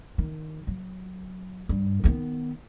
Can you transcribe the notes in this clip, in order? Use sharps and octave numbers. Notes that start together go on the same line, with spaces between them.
D#3
F#3
G2
D#3 B3